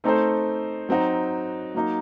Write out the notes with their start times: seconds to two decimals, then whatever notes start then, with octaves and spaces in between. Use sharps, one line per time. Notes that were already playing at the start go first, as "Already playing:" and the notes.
0.04 A3 C4 D#4 A4 C5
0.89 F#3 C4 D#4 F#4
1.75 F#3 A#3 D#4